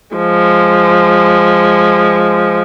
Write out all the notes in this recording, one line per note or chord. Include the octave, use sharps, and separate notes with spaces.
F3 G#3